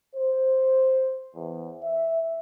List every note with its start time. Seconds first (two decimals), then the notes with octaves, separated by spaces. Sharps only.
0.15 C5
1.34 E2
1.83 E5